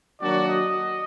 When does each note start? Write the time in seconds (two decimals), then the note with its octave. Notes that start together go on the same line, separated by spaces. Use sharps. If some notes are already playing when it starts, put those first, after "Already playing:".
0.20 D#3 F#3 A#3 D4 F#4 D5
0.48 D#5